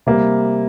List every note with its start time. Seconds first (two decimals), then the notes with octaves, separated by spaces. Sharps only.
0.07 C3 G3 A#3